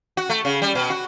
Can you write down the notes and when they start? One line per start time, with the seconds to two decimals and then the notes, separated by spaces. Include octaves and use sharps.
0.17 F#4
0.30 A3
0.45 C#3
0.62 G3
0.75 B2
0.90 F#4